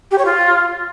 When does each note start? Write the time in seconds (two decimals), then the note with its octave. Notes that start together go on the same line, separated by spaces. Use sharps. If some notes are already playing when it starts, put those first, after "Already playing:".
0.11 G4
0.18 C#5
0.25 F4